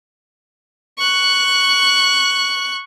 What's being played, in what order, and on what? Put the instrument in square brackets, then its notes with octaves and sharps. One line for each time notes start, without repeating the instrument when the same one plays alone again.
[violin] C#6 F#6